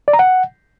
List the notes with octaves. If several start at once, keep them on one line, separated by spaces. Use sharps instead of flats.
D5
A#5
F#5